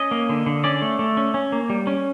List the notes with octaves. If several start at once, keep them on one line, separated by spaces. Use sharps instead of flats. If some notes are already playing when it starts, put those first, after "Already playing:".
Already playing: C#4 D#5
A#3
D3
D3
C#4 D5
A3
A3
C#4
C#4
A#3
G3
C#4